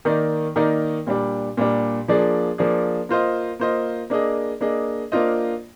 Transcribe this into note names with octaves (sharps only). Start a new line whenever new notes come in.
D#3 A#3 D#4 A#4 D5
D#3 A#3 D#4 A#4 D5
A#2 G3 D4
A#2 G3 D4
F3 A#3 D4 G#4 D5
F3 A#3 D4 G#4 D5
A#3 F4 C5 D#5
A#3 F4 C5 D#5
A#3 D4 G#4 D#5
A#3 D4 G#4 D#5
A#3 D4 F4 C5 D#5